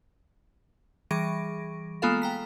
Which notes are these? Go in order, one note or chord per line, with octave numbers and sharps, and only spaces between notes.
E3 G3 G#4 C#6 A#6 D7
G#3 A#3 B3 F4 A4 F5
G5 A#5 B6